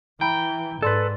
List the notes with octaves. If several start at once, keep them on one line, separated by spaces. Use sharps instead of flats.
E3 G5 A#5 B5
G#2 A4 B4 D5 C6 A6